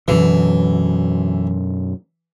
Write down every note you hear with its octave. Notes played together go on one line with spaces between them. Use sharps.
F#2 B2 D3 E3